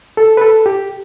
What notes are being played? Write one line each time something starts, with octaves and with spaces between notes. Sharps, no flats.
A4
B4
A4
G4